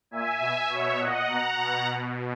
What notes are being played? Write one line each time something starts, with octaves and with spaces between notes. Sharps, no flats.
A#2 E5 G#5
B2 E5 G#5
B2 C#5 E5
A#2 D#5 F#5
B2 F#5 A#5
B2 F#5 A#5
B2